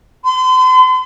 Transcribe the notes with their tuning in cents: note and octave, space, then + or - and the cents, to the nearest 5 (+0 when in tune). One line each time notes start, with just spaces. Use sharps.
C6 -40